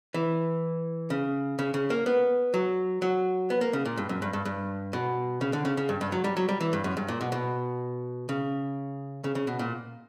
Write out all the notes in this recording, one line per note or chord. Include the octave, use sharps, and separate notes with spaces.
E3
C#3
C#3
C#3
A#3
B3
F#3
F#3
B3
A#3
C#3
A#2
G2
F#2
G2
G2
G2
B2
C#3
D3
C#3
C#3
G2
G2
F#3
G3
F#3
G3
E3
G2
F#2
G2
A#2
B2
B2
C#3
C#3
C#3
B2
A#2